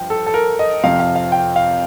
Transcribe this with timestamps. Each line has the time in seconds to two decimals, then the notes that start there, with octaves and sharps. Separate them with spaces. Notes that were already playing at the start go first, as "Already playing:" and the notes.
Already playing: G2 F3 G5
0.10 A4
0.26 A4
0.34 A#4
0.59 D#5
0.83 F2 C3 F3 F5
1.00 F5
1.16 F5
1.32 G5
1.56 F5